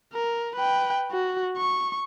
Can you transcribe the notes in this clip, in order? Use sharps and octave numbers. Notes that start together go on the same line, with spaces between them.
A#4
B4 G5
F#4
C#6